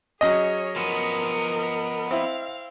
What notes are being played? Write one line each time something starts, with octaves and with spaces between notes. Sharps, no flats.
F#3 C#4 G#4 C#5 D#5 D#6
F3 B3 A#4
C4 E4 F5